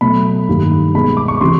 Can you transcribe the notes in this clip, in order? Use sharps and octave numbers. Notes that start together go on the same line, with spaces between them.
B2 F#3 A3 B5
G2 D#3 G3 A#3
B2 G#3 B3 B5
D6
C#6
C3 E3 G3 C6